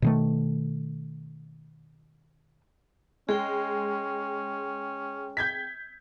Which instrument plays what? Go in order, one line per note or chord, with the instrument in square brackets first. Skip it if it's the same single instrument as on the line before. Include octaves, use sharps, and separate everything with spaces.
[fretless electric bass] B2 D#3 A3
[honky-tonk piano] G#3 [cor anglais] C#4 [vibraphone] G#4 G5
[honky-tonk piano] G6 G#6 B6